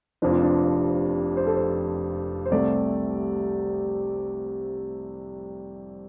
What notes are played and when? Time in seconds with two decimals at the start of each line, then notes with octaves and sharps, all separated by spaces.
0.22 F1 F2 C3 F3 D4
0.32 F4
0.43 D4
1.37 C5
1.47 A4
1.56 C5
2.46 C5
2.51 C2 C3 A3 C4 D5